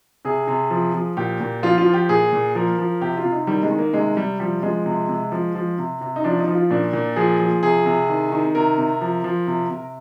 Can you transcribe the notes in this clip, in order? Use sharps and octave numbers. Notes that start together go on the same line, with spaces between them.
C3 G#4
C3
F3
F3
A#2 G4
A#2
F3 F4
F4
F3
G4
A#2 G#4
A#2
F3 A#4
F3
C3 G4
F4
C3
D#4
D#3 G3
G#3
D#3
A#3
C3 G#3
C3 G3
F3 G3
F3 G#3
C3
C3
F3
F3
C3
C3
D#4
F3 D4
D#4
F3
F4
A#2 D4
A#2
F3 G#4
F3
C3 G#4
C3
D#3
D#3
C3 A#4
C3
F3
F3
C3
C3